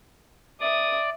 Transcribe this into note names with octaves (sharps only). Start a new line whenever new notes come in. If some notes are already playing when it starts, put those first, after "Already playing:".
D5 E5 D#6